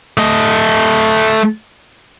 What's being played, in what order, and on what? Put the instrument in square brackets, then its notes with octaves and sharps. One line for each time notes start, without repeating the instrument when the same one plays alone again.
[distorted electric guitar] A3 D#5